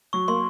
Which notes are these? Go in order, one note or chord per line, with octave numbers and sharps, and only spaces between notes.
F#3 C#6
A#3 C6